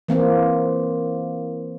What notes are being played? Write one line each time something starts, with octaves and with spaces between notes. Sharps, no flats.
E3 A#3 C4